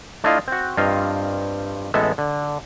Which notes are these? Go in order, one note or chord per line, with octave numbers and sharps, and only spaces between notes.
A3 D4 E4 F4 D#5 F5
C4 F#4
G2 C4 F4 D#5 F5
A1 G#3 B3 A4 E5
D3